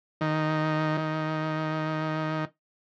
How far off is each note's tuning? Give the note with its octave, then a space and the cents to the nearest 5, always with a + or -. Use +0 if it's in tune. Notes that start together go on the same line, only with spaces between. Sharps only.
D#3 +0
D#3 +10